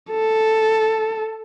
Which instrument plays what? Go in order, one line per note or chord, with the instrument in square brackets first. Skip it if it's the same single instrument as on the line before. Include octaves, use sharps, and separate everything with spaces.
[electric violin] A4